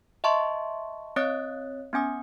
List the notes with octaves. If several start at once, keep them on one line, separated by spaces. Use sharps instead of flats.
D#5 E5 A5 C6 C#6
C4 C#5 D#5 D#6 F#6 A6
B3 C#4 G#5 D#6